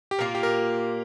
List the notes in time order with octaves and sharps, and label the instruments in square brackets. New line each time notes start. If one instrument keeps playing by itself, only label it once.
[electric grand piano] G4
[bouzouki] A#2 A#3 F4 [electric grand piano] A#4
[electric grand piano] G4
A#4